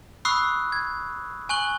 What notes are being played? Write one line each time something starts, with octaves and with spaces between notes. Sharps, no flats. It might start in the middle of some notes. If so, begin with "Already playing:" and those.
B5 C#6 D#6 E6 F#6 C7
G#6
G#5 C#6 F#6 F#7 G7